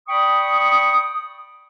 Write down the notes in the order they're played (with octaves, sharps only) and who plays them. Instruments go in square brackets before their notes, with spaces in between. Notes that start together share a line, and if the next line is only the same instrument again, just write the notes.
[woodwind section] D5 G5 B5 C#6 D#6